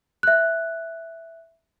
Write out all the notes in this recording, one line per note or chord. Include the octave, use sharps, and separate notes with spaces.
E5 F#6